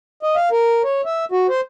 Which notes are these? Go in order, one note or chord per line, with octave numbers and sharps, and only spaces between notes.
D#5
F5
A#4
C#5
E5
F#4
C5